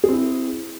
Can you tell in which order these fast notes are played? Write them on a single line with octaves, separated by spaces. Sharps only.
G#4 C4 E4